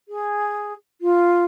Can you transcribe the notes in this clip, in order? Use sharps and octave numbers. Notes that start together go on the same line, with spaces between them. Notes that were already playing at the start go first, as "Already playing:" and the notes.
G#4
F4